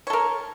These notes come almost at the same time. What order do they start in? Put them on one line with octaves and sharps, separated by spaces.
C#5 A4 A#4